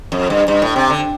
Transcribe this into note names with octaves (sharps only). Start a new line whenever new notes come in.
F2
G2
G2
A2
C3
D3